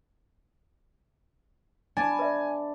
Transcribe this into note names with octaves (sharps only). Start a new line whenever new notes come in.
D4 G#5 A#5 B5
B4 D5 E5